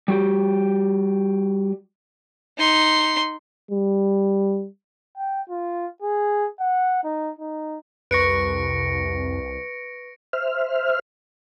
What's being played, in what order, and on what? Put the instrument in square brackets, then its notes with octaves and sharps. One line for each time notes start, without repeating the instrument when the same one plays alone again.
[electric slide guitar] G3 F#4 G4
[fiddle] D#4 C6
[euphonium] G3
[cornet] G5
F4
G#4
F#5
D#4
D#4
[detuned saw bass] C2 [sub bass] F2 [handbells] B4 C#6 [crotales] A#6 C#7 D7
[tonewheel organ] C5 E5 F6